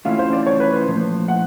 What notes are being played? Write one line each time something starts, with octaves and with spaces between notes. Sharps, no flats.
C3 E3 A3 C#4 F4 F5
C5
D5
C#5
B4
C5
A#2 F3 A3
F#5